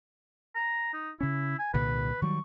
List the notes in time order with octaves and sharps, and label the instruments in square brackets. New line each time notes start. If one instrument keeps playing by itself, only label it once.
[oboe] A#5
D#4
[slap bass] C#3 C#4 [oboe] E4
[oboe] G#5
[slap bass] C2 A#2 D3 [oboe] B4
[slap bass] D#3 F#3 G3 [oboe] C#6